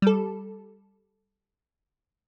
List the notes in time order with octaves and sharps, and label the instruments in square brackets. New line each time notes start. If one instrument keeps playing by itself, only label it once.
[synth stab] G3 A4